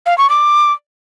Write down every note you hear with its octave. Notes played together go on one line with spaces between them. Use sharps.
F5
C#6
D6